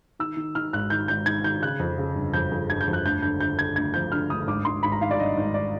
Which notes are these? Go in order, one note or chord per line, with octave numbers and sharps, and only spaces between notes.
D#3 E6
D#3
D#3 F6
G#1 F#6
D#3 G6
G#1 G6
D#3 G#6
D#3 G6
C#3 F#6
F2
C#3
G1
F2 G6
F2
G1 G#6
G6
F2
F#6
D2 G6
D3 G6
D3 G6
D3 G#6
D2 G#6
F3 G6
D3 F6
D2 D#6
G#1 D6
G#1 C6
G#1 B5
A#5
D#3 F5
D5
G2 D#5
G#1
D5